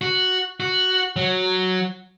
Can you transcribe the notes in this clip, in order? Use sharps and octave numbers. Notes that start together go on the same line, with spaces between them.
F#4
F#4
F#3